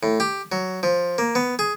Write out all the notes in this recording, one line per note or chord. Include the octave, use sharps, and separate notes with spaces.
A2
G4
F#3
F3
A#3
B3
G#4